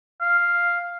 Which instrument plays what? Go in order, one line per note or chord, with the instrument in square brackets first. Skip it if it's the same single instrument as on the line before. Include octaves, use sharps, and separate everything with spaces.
[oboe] F5